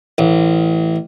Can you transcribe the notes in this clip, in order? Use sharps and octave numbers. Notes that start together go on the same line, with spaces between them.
A1